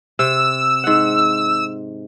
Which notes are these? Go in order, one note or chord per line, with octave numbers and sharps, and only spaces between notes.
C3 E6
G#2 F#5